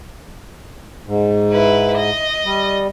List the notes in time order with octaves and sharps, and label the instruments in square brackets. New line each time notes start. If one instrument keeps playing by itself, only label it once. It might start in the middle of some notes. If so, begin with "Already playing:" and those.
[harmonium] G#2
[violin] E4 B4
D#5
[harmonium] G3